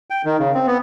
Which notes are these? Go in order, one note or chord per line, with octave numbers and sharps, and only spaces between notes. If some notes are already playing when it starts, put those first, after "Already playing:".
G5
D#3
C#3
C4
B3